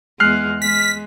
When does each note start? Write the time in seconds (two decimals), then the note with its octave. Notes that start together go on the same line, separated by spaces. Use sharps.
0.20 E2 G#3 F6 F#6 C7
0.62 G#3 B6